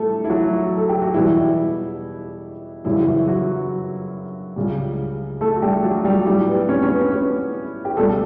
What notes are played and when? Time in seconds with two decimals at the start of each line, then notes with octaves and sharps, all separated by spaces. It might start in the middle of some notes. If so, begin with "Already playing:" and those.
Already playing: A2 G3 A3 A4
0.24 E4
0.30 F#3 F#4
0.77 A4
0.89 G4
1.02 F#4
1.14 E2 B2 E3 G3 E4
2.85 F#2 C#3 E3 G3 E4
2.96 F#4
3.08 E3 E4
3.27 F#3 F#4
4.56 C#2 C#3 G3
5.41 A3 A4
5.56 F#4
5.62 G3 G4
5.84 F#3 F#4
6.05 G3 G4
6.26 A2 G3 G4
6.48 B3
6.69 C#4
6.83 C#4
6.90 B3
7.12 C#4
7.85 G4
7.97 C#2 B2 G3 A3 A4